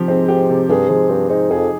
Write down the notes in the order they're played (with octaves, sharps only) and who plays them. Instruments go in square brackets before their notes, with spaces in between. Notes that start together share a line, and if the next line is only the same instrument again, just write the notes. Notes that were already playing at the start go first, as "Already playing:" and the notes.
Already playing: [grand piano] C3 F3 G4
[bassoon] G#2 [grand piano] C4
[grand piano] G4
C3
[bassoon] G2 [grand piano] G#4
[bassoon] G#2 [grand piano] F3
[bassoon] G2 [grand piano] C4
[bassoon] G#2 [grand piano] D#4
[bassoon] F2 [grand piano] G#4